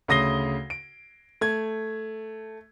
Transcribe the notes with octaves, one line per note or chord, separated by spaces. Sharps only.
D2 C#3 D#6 A#6 C7 G7
D7
A3 G#6